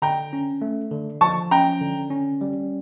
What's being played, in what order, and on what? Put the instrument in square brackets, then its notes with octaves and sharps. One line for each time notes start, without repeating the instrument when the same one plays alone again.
[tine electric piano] D3 [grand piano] G5 A#5
[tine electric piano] C#4
A3
D3
[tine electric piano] F3 [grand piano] A5 C#6
[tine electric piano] C#4 [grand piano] G5 A#5
[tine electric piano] D3
C#4
G3